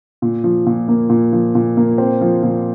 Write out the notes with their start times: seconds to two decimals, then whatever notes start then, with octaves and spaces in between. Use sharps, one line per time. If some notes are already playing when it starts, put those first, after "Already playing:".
0.22 A#2
0.44 F3
0.66 A#2
0.88 A#3
1.09 A#2
1.33 F3
1.55 A#2
1.77 A#3
1.98 C4
2.21 F3
2.43 A#2